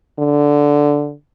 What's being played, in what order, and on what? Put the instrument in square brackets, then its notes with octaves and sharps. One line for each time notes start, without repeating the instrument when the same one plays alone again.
[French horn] D3